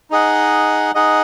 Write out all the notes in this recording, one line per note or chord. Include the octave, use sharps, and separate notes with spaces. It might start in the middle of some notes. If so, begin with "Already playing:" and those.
D#4 G#4 D#5 F#5
D#4 G#4 D#5 F#5